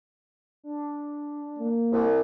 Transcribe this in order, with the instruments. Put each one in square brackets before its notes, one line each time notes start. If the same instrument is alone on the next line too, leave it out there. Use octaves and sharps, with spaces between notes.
[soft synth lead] D4
[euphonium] A#3
[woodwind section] C2